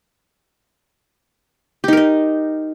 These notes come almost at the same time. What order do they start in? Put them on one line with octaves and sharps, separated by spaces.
G4 D#4 A#4 D#5